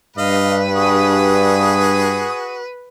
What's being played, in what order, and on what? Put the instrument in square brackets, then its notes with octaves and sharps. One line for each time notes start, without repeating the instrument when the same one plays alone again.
[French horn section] G2 [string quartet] B4 [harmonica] D#5 F5
[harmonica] F#4 G#4 D#6